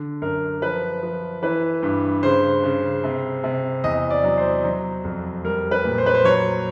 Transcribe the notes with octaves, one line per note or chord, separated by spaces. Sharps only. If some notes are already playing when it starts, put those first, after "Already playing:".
Already playing: D3
F#2 A#4
F3 B4
F3
E3 B4
G2
C#3 C5
C#3
C3
C3
E2 D#5
D5
F#3
C5
F#3
F2
G3 A#4
B4
A#2
C5
B4
C5
F#3 C#5